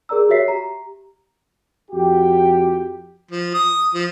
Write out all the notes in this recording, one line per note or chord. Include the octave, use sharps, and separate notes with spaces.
G#4 A#4 D5 A#5 E6
F#4 G4 C#5 E5 B6 C7
G4 A#5
F2 F#4 G4
F3
D#6
F3